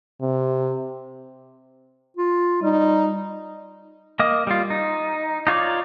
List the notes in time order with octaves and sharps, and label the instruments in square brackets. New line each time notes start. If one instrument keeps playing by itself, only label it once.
[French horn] C3
[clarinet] F4
[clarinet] G3 [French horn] D#4
[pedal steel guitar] A#3 D#5 D#6
G3 F4
D#4
D#4 F4 C#5 D5